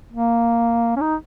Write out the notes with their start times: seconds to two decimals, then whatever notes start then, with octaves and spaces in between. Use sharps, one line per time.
0.12 A#3
0.96 C#4
1.01 D#4